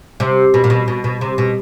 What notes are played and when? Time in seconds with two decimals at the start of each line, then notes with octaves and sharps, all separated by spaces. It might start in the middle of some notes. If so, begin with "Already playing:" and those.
0.20 C3
0.54 B2
0.64 A#2
0.70 B2
0.88 B2
1.04 B2
1.21 C3
1.38 B2